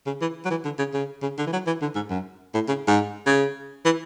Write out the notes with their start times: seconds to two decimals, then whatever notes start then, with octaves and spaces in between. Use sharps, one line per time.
0.06 C#3
0.21 E3
0.45 F#3
0.50 E3
0.65 D3
0.79 C#3
0.94 C#3
1.22 C#3
1.38 D3
1.47 E3
1.53 F#3
1.67 E3
1.82 D3
1.95 G#2
2.10 F#2
2.54 A2
2.68 C#3
2.87 G#2
3.26 C#3
3.85 E3